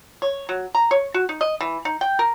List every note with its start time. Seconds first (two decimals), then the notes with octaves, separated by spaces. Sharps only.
0.22 C#5
0.49 F#3
0.75 A#5
0.91 C#5
1.14 F#4
1.29 D#4
1.41 D#5
1.61 E3
1.85 D#4
2.01 G5
2.19 A#4